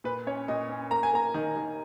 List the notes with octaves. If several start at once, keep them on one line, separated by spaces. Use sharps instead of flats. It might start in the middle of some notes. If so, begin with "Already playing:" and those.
A#2 B4
C#4 C#5
A#2 D#5
C#4
A#3 A#5
G#5
A#3 A#5
D#3
D#3